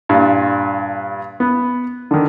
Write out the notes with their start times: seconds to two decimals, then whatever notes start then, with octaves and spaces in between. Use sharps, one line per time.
0.09 G2 A#2
1.40 B3
2.11 D3 D#3